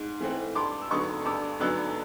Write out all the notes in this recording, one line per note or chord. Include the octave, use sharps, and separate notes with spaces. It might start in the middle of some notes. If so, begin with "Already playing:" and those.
Already playing: G#2
E3 A3 C4
G2 C6 D6
E6
D3 F#3 B3 D#4 C#6 D#6
G2 D6 E6
D3 F#3 B3 D#4 E6 F#6